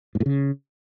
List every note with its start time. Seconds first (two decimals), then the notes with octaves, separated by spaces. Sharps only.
0.15 G#2
0.20 A2
0.26 C#3